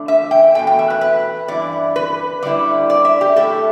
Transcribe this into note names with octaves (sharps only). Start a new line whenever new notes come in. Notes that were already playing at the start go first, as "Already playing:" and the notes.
Already playing: E2 D3 A3 D4
E5
G5
E2 B2 A3 G5
G5
E5
B4
B4
G2 E3 E4 D5
B4
D3 G3 E4 D5
D5
E5
G4
A2 A3 E4 A4